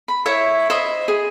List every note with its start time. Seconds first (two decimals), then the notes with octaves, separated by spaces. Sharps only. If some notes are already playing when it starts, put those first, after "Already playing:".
0.08 B5
0.26 E4 C#5 E5
0.70 C5 D#5 E5 B5
1.08 G#4